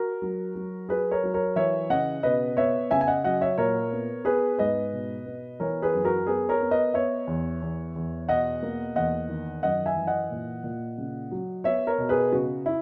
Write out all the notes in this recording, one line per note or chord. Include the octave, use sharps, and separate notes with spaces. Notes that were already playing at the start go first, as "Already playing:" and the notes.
Already playing: F#4 A#4
F#3
F#3
F#3 G#4 B4
A#4 C#5
F#3
A#4 C#5
E3 C#5 E5
C#3 D#5 F#5
B2 B4 D#5
B3 C#5 E5
C#3 E5 G#5
G#5
D#5 F#5
F#3 D#5 F#5
C#5 E5
A#2 A#4 C#5
B3
B3 G#4 B4
G#2 B4 D#5
B2
B3
E3 A#4 C#5
G#4 B4
F#2
F#4 A#4
B3 G#4 B4
A#4 C#5
B3
B4 D#5
B3 C#5 E5
E2
E2
E2
B2 D#5 F#5
A#3
E2 D#5 F#5
D#3
F#2 D#5 F#5
E5 G#5
E3
D#5 F#5
A#2
A#2
C#3
F#3
B3 C#5 E5
A#4 C#5
B2
G#4 B4
C#3 F#4
E4